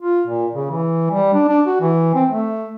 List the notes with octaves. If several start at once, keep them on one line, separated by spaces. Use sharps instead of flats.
F4
A#2
C#3
E3
G3
D4
D4
F#4
E3
C4
A3